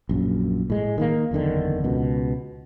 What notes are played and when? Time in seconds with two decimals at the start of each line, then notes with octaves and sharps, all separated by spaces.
0.09 A#1 F#2
0.70 A2 G#3
0.98 D#3 A3 A#3
1.31 F#1 E2 D3 D#3
1.84 C#2 B2